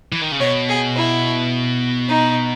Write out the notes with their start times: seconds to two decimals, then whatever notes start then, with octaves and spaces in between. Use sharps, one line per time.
0.12 E3
0.22 D#3
0.32 C#3
0.40 B2 C#5
0.69 G#4
0.96 E4
2.09 D#4